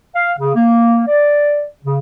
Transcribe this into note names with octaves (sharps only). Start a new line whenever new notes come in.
F5
C#3
A#3
D5
C#3